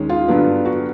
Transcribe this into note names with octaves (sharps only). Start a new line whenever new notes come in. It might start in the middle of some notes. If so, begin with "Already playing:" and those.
Already playing: D#2 D#3 G#3 C#4
F4
G2 D3 F#3 B3 D4
F#4